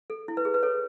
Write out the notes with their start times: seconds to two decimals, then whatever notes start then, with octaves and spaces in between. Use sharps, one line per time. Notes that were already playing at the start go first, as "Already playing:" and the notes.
0.10 A4
0.28 E4
0.37 B4
0.45 G#4
0.54 B4
0.63 A4 C#5